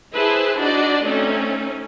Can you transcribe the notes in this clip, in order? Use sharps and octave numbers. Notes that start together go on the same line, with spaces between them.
E4 G#4 B4 C5 A5
D4 D#4 F#4 D5 D#5
A3 C4 C#4 D#4